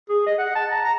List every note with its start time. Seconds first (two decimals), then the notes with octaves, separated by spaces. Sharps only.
0.10 G#4
0.27 D#5
0.39 F#5
0.55 A5
0.71 A#5
0.85 A#5